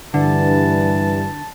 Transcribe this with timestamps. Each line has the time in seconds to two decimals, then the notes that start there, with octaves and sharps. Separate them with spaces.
0.14 G2 D3 E3 A5